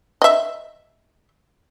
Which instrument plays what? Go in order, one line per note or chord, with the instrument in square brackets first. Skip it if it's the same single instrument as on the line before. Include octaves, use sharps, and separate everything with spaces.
[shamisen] D#5 E5